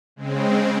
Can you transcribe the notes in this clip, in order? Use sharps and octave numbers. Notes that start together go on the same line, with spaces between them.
C#3 G#3 C4